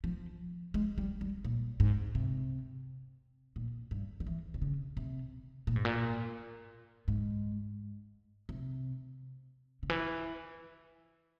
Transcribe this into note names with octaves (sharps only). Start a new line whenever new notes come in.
F3
G#3
G3
G3
A#2
G#2
C3
A#2
G2
F3
E3
C3
C#3
C3
A#2
G#2
A#2
G#2
C3
C#3
E3